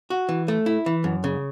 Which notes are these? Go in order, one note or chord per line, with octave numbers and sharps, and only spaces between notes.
F#4
E3
A3
E4
E3
F#2
C#3